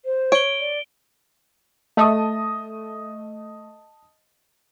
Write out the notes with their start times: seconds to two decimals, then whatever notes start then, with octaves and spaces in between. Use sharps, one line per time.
0.05 C5
0.32 C#5 D7 G7
0.60 D5
1.97 A3 D#5 A5 D#6